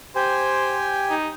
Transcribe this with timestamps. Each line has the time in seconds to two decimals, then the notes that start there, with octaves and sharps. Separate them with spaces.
0.16 G4 C5 G5 G#5
1.10 D#4